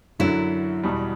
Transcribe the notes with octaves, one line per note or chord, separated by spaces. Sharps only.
F#2 D3 F#3 E4
E2 B2 G3